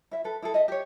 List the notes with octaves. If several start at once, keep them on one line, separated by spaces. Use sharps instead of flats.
E4 E5
A4 B4
E4 G#4 A4
D#5 E5
G4 C#5